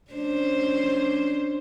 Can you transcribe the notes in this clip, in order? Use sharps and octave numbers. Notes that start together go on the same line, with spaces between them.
C#4 D4 C5